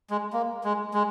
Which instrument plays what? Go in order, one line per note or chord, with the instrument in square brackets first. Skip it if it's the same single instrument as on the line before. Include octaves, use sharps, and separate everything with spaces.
[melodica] G#3
A#3
G#3
G#3